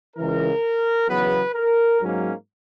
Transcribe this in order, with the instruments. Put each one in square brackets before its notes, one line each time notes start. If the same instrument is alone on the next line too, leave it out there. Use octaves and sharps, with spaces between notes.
[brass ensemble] C#2 C#3 E3 A#4
E2 C#3 F#3 B3 B4
A#4
G#2 F#3 A#3 C#4